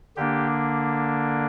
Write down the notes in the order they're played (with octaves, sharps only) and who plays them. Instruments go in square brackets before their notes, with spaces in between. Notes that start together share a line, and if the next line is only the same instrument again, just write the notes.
[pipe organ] D3 A#3 D4 G4